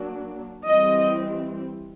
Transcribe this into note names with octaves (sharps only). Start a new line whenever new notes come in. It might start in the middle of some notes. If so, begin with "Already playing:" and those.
Already playing: F#3 A#3 D4
E3 G3 C4 D#5